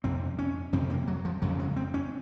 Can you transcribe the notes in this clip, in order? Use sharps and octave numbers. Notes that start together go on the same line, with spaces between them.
F2 C3 C4
C#4
F2 C3 C4
A#3
F#3
F3
F2 C#3 F#3
G#3
C4
C#4